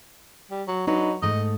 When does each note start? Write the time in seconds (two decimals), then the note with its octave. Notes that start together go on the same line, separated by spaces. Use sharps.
0.51 G3
0.68 F#3
0.87 F#3 D4 D#4 B4
1.22 G#2 A3 D#5